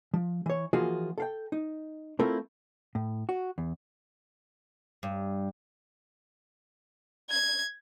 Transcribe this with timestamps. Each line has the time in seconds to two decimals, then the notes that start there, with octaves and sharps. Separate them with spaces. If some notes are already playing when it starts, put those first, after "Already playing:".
0.14 F3
0.46 E3 C#5
0.73 E3 F3 A#3 F4 F#4 G#4
1.18 A4 F5 G5
1.52 D#4
2.19 A3 C4 E4 F4 A4 A#4
2.95 A2
3.29 F#4
3.58 E2
5.03 G2
7.30 G#6